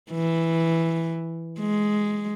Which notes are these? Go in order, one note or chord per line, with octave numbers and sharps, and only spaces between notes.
E3
G#3